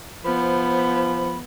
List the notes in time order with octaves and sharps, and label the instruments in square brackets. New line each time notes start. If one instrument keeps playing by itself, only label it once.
[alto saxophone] F3 [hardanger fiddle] B3 [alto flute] C5 [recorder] B5